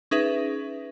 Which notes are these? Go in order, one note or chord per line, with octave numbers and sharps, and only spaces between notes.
C#4 D#4 G#4 B4 E5